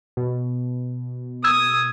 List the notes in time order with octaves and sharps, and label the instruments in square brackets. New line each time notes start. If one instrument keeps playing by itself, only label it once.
[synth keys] B2
[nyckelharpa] D#6 [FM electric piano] E6 G#6